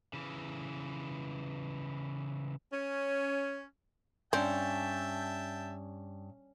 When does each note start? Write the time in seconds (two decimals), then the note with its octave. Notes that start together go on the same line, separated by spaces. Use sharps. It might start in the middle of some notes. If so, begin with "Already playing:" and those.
0.13 C#3 E3
2.72 C#4
4.33 G2 C4 C#4 E5 G5 A5